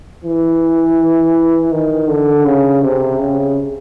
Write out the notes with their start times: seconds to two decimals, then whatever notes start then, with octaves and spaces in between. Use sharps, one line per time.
0.24 E3
1.72 D#3
2.08 D3
2.45 C#3
2.82 C3
3.19 C#3